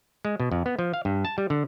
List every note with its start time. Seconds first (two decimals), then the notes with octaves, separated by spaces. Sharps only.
0.25 G#3
0.40 B2
0.52 F2
0.66 B3
0.79 F3
0.94 F5
1.05 G2
1.25 A5
1.38 G3
1.50 D3